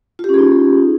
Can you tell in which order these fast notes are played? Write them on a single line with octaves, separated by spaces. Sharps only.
F4 G4 C#4 G#4 D#4